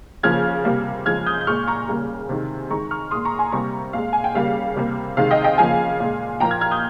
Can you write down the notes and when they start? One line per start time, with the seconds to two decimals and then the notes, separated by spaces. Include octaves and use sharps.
0.23 C#3 F3 A#3 F6 G#6
0.65 C3 G3 A#3
1.06 C#3 F3 G#3 F6 G#6
1.26 D#6 G6
1.41 G6
1.47 A#2 G#3 C#6 F6
1.67 A#5 C#6
1.88 C#3 G3 A#3
2.29 C3 D#3 G#3
2.70 D#3 G#3 A#5 C#6
2.91 C#6 F6
3.11 A#2 G#3 C6 D#6
3.25 A#5 C#6
3.39 G#5 C6
3.52 C3 G3 A#3 A#5 C#6
3.93 A#2 G#3 F5
4.13 G#5
4.24 G5
4.34 C#3 G3 A#3 F5
4.76 C3 G3 A#3
5.17 C3 D#3 G#3 F5
5.31 D#5 G5
5.44 D#5 G5
5.58 C#3 F3 A#3 F5 G#5
6.00 A#2 G#3
6.40 A#2 F3 A#3 G5 A#5
6.51 F6 G#6
6.61 F6 G#6
6.71 D#6 G6